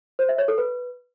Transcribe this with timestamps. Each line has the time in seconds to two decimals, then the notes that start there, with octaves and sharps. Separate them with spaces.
0.19 C5
0.29 E5
0.38 C#5
0.48 A4
0.58 B4